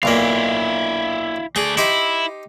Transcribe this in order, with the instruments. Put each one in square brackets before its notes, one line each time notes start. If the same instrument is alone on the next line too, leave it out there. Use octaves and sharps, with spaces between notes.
[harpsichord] B1 A#2 A#3 [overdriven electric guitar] E4 F5
[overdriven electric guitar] A3 D5 [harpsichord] G#4
[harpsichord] D#4 G4 C5 [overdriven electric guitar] E4